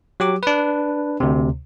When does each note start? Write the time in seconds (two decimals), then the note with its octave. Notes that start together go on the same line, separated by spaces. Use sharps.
0.20 F#3 G4 D6
0.43 D4 B4
1.20 D2 C3